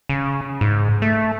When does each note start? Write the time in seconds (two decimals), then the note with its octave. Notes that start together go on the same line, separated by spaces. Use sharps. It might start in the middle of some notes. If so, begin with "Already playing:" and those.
0.09 C#3
0.61 G#2
1.02 A3